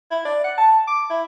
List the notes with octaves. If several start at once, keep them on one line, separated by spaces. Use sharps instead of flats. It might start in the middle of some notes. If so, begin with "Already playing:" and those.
E4
D5
F#5
A5
D6
E4